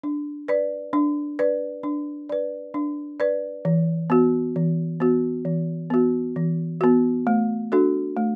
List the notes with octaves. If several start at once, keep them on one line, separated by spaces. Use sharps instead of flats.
D4
B4 D5
D4
B4 D5
D4
B4 D5
D4
B4 D5
E3
B3 F#4
E3
B3 F#4
E3
B3 F#4
E3
B3 F#4
A3
D4 F#4 A4
A3